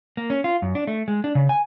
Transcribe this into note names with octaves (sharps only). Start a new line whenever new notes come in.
A#3
C#4
F4
F#2
D4
A3
G#3
D4
C#3
G#5